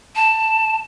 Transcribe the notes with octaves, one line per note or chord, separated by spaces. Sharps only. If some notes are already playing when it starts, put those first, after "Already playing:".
A5